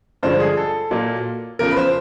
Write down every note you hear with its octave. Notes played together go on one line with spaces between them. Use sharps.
G2 D3 F3 G#3 C5
G#4
A4
A#2 F#3 A#3
E2 C#3 F3 A#4
B4
C5